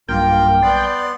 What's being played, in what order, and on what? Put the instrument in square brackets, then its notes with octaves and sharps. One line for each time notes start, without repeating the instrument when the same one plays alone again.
[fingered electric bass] B1 G3 [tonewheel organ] G2 A#3 [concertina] F4 A#4 [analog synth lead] G5
[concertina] B3 C6 [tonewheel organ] D5